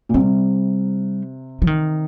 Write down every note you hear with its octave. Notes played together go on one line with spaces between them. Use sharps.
A#2
C3 G3
F3
D#3